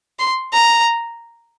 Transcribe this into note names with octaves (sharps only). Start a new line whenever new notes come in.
C6
A#5